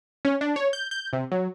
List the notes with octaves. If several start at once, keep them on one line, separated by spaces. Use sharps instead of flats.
C#4
D4
C#5
G6
G6
C3
F#3